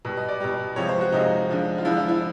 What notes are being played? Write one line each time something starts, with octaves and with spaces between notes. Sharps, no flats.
B2 G3
D#5
D5
B2 G3
C3 F3 G#3 C#5
C5
F#4
C3 F3 G#3 D#4
D3 F3 G#3
F4
D3 F3 G#3 E4
F4
E4